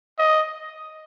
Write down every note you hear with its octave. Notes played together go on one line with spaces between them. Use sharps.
D#5